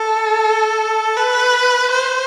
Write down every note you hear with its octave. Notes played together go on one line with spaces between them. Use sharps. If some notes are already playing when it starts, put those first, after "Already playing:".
Already playing: A4
B4
C5